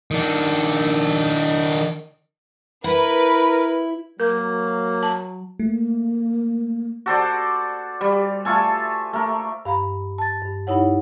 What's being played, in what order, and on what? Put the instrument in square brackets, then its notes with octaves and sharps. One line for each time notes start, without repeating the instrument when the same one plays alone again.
[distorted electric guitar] D#3 D4
[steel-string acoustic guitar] E4 [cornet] A#4 [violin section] B4
[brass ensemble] F#3 [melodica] A#3 [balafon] A#4
[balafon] A5
[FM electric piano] A3 [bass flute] A#3
[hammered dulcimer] F#4 A4 C5 D5
G3
A3 F4 A4 G#5
A3 A#4
[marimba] G2 F5 A#5 B5
A5 A6
G2
G2 D#4 E4 C#5 F#5